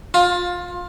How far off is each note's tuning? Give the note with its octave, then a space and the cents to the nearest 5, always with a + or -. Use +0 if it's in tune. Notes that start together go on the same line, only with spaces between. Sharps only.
F4 +20